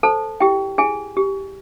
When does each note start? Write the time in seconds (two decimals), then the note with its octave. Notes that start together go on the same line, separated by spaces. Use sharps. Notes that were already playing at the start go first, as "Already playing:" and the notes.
0.03 A4 C5 A5
0.40 E4 G4 G5
0.78 E4 G#4 G#5
1.17 G4